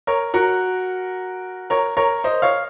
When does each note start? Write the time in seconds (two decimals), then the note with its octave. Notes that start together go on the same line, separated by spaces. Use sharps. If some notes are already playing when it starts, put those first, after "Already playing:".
0.07 A#4 C#5
0.34 F#4 A#4
1.70 A#4 C#5
1.97 A#4 C#5
2.24 C5 D#5
2.42 C#5 F5